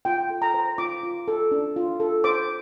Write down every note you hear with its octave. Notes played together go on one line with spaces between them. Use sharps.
F4 G5
A4
A#5
C5
F4 D6
F4
A4
D4
F4
A4
C5 D6